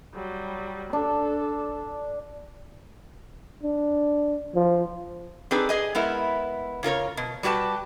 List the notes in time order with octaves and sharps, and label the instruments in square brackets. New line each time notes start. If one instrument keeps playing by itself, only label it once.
[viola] F#3 G3
[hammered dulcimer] D4 [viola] A4
[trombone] D4
F3
[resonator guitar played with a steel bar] C4 D4 D#4 G#4 A4 B4
G#4 D#5 G#5
G#3 B3 E4 A#4
C#3 F4 A#4 C#5
B2
G3 F#4 G4 B4 A5